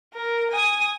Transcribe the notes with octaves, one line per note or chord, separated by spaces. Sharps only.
A#4
G#5 D#6